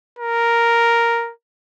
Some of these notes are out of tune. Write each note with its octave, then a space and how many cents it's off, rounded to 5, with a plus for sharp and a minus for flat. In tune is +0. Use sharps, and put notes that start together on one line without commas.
A#4 +0